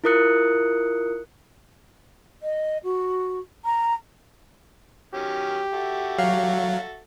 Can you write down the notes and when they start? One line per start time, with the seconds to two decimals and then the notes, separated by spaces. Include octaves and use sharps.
0.04 E4 F4 A#4 D#6 F#6 C#7
2.41 D#5
2.84 F#4
3.65 A#5
5.14 D#3 F#3 C#4 G4
5.73 F#4 A4 E5
6.19 F#3 F5